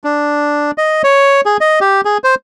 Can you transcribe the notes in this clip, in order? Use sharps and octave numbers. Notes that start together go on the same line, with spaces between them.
D4
D#5
C#5
G#4
D#5
G4
G#4
C5